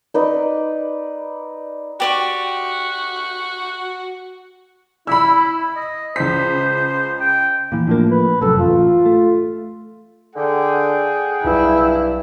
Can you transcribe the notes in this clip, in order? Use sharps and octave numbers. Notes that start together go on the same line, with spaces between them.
D#4 B4 D5 D#5
F#4 G4 D5 C#6
E4 B5 E6
D#5
C#2 C5 B6
G5
A#2 E3
A2 F3 A#3 D4
B4
F1 F#2 A4
A1 F4
A3
D3 G#4 F#5 G5
B1 G2 E4